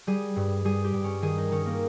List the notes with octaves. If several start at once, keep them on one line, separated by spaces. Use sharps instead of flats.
G3 G#4
G2
G3 G#4
G4
G2
C#4
D#3 G#4
D#4
D#3 C#4
A#3